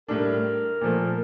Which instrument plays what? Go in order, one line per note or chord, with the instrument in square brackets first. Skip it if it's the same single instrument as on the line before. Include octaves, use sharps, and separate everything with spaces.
[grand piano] A2 G3 D4 [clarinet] A#4
[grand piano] A#2 F3 A3